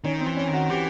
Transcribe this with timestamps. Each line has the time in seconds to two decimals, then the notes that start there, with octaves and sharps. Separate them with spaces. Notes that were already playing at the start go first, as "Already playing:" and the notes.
0.04 D#3 C#4
0.20 C4
0.26 E3
0.36 C#4
0.48 D#3
0.53 F#4
0.69 E3 G4